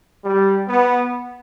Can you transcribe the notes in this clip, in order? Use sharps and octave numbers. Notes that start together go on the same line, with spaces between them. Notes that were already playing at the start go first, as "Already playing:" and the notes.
G3
B3